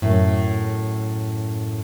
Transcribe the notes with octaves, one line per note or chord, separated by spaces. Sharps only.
F#2 A2